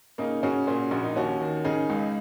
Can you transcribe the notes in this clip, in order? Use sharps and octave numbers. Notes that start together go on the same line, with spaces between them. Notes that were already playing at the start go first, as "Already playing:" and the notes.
C#3 A#3 D#4
C#3 C#4 F#4
A#2 C#4 F#4
A#1 F#4
D#4
D#2 C#4 F#4
D#3
C#3 D#4 G#4
C#2